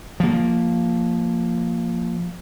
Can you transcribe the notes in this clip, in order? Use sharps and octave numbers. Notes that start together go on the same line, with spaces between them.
F3 A#3